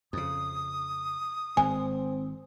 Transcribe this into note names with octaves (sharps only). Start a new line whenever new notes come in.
F2 C#3 D#6
G#1 G#3 C4 G#5